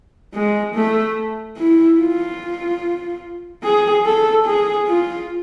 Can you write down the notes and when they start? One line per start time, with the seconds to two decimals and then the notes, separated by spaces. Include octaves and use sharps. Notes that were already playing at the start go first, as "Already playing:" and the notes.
0.34 G#3
0.75 A3
1.57 E4
1.99 F4
3.63 G#4
4.05 A4
4.46 G#4
4.87 F4